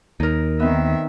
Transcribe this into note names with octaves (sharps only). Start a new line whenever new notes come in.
D#2 D#4 A#4
D#3 B3 C4 E5